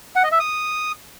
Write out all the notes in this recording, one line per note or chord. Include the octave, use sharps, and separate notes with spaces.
F#5
D#5
E5
D#6